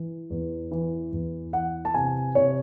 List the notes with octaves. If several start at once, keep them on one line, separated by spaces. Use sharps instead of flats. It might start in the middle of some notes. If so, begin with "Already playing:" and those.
Already playing: E3
E2
E3
E2
E3 F#5
A5
C3 G#5
C3 C#5